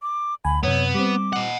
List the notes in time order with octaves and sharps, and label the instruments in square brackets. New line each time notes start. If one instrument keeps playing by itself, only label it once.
[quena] D6
[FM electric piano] D2 G#5 [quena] B5
[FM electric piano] F#2 C3 [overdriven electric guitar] B3 [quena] C#5
[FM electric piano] G3 C4 [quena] D6
[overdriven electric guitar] D#5 F#5